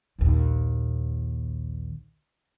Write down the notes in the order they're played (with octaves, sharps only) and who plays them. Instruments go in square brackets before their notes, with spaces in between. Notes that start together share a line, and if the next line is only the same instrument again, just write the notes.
[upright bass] A#1 D#2